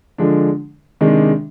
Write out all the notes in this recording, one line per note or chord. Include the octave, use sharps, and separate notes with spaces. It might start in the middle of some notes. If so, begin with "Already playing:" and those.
D3 F3 G#3 D4
C3 D#3 G#3 D4